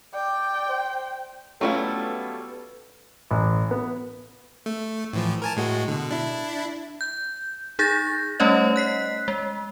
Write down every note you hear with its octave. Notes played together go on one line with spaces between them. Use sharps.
D5 G5
C5
F#3 G3 A3 B3 C#4 E4 F4 A4
A1
B3
A3
A2 E3 F3
A#4 G#5 A5
A2 G#3 F#4
B2 D3
D4 E4
G6
D#4 G#4 G6 A6 A#6
G3 A3 C#4 C#5 D#5
F#6 B6 C7
G#3